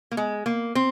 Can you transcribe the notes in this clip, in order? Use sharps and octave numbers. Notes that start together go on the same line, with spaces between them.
A#3
G#3
A#3
C4